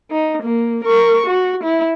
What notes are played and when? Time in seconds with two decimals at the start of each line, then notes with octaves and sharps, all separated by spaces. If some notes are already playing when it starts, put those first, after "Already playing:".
0.11 D#4
0.42 A#3
0.84 A#4 C#6
1.26 F#4
1.63 E4